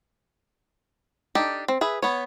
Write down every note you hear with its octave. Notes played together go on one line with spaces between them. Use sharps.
D4 D#4 G4 A4
C4
G#4 B4 E5
B3 C#5